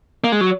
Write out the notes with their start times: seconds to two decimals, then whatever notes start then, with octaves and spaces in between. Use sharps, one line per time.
0.24 A#3
0.32 G#3
0.41 F#3